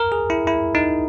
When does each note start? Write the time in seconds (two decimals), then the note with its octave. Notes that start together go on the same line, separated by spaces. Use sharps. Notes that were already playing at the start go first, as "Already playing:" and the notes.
Already playing: A#4
0.12 G#4
0.30 E4
0.47 E4
0.75 D#4